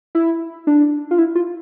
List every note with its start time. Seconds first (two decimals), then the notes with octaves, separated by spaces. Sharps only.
0.15 E4
0.67 D4
1.11 F4
1.18 E4
1.35 F4